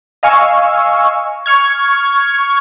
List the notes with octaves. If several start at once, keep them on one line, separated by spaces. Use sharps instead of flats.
D#5 F5 G#5 C#6 E6
C#6 F6 G#6